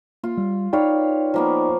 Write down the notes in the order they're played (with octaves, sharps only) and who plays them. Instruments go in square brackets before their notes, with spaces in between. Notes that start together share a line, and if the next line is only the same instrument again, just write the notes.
[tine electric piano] A#3 [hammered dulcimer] F4
[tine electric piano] G3
[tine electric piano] D#4 D5 G5 [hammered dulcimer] B4 C#5 F5
[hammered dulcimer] F3 A#3 B3